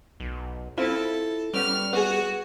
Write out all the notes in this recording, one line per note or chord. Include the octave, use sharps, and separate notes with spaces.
B1
C4 E4 F4 A4
G3 B3 C#4 F6
B3 F#4 G#4